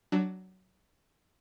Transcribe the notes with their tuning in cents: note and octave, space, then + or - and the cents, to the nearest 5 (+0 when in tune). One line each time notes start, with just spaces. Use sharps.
F#3 +15 D4 +0